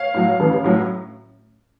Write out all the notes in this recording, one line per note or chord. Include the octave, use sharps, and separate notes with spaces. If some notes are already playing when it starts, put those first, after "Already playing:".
Already playing: C#5 F5
A2 F#3
A1
A2 F#3